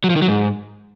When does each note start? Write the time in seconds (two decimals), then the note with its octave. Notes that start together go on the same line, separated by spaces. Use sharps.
0.04 F#3
0.10 F3
0.16 D#3
0.22 F#3
0.28 G#2